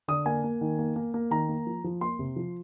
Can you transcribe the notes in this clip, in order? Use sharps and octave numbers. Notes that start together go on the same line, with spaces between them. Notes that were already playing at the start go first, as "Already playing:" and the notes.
D3 D#6
A#3 G#5
A#3
D#3
A#3
A#3
A#3
D#3 A#5
A#3
F3
F3
A#3 C6
C3
F3